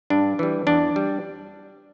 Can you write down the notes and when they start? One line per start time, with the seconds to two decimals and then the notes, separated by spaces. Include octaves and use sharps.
0.10 G2 D4
0.39 E3 G3
0.67 E2 D4
0.96 G3